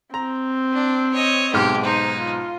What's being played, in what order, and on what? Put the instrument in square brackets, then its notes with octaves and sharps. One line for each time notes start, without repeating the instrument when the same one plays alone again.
[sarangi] C4 [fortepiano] A#5
[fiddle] D4
C#5 D#5
[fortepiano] B1 G#2 F6 [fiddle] G4
[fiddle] D#4 [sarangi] C5
[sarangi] F4